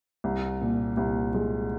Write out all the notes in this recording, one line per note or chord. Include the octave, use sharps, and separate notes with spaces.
C2
A#2
C2
G#3